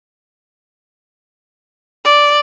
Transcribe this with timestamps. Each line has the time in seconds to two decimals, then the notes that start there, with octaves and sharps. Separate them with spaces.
2.05 D5